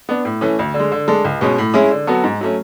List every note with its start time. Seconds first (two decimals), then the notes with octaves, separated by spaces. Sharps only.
0.09 B3 D4
0.25 A2
0.41 E3 A3 C#4
0.59 D2
0.74 D3
0.79 G#3
0.92 D3
1.08 G#3 D4 A4
1.25 C#2
1.41 B2 G#3 C#4
1.58 A2
1.74 G#3 C#4 E4 G#4
1.91 D3
2.07 F#3 B3 F#4 A4
2.24 G#2
2.41 F#3 A3 C#4